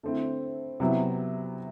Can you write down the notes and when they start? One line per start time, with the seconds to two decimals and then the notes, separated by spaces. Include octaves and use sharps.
0.03 D3 A3 C4 E4
0.80 C3 F#3 B3 E4